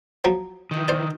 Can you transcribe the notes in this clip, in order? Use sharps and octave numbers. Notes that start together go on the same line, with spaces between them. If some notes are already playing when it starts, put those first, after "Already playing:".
F3 F#3
D#3 E3
C5 D5